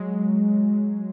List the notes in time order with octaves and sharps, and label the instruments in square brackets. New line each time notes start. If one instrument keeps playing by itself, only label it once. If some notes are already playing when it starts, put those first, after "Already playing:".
Already playing: [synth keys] F#3 G#3